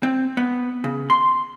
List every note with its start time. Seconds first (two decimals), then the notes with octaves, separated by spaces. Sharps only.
0.03 C4
0.37 B3
0.84 C#3
1.10 C6